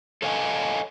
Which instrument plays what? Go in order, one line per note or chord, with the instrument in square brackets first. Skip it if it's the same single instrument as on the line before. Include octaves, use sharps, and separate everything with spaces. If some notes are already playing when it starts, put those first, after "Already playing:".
[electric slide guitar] A4 C#5 D#5 F5 F#5 G#5